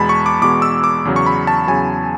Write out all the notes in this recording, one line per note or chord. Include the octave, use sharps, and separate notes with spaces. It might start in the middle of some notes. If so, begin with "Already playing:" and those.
Already playing: E2 B2 G#3 A5 B5
C#6
D6
E2 B2 G#3 D6
E6
D6
E2 C#3 F#3
C#6
B5
A5
E2 C#3 F#3 G#5